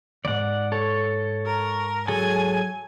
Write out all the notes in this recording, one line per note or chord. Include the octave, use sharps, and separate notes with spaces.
E2 G#2 D5 F#5
A4 C#5
A#4
F#3 G#4 A4 G#5